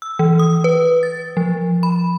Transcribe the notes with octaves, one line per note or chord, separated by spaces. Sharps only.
E6
E3
D#6
B4
A6
F3
B5